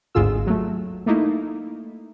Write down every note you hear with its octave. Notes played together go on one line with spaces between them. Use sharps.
G#1 D2 G#2 G#3 F4 E6
F#3 A3
A3 A#3 D#4 E4